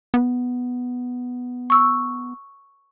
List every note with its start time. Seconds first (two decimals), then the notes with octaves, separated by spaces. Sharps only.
0.14 B3
1.70 C#6 E6